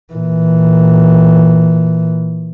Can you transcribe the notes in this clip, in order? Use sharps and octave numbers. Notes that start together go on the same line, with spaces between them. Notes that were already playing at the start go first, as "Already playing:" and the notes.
A#2 E3